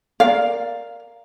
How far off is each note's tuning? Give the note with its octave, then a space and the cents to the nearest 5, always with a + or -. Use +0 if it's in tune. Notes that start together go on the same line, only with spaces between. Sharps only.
A#4 +0 D5 +0 F5 +0